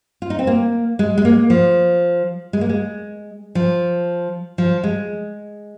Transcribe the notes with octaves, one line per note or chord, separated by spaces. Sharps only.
F4
D#4
C4
A#3
G#3
G#3
A#3
F3
G#3
A#3
G#3
F3
F3
G#3